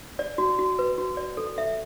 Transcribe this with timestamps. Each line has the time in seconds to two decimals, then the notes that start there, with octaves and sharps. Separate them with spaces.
0.19 D5
0.38 F#4
0.59 F#4
0.79 B4
0.98 F#4
1.17 D5
1.37 A4
1.58 E5